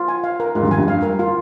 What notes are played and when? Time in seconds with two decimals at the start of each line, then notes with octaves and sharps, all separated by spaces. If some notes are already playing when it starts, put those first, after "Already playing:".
Already playing: F4
0.08 G#5
0.24 F5
0.40 A#4
0.55 G#2 F4
0.63 G2
0.71 F2 G#5
0.78 G2
0.88 F5
1.03 A#4
1.19 F4